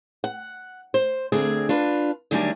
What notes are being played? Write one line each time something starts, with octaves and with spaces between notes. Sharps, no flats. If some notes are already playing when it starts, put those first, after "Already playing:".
F#5
C5
D2 D3 C4 G#4
D4 F4 B4
D2 D#3 F#3 G3 D4 G#5